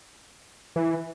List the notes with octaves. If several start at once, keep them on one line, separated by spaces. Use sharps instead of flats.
E3